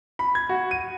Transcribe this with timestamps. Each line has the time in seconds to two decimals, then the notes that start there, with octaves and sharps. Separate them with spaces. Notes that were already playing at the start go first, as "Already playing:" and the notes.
0.19 B5
0.35 G#6
0.49 F#4
0.71 D#7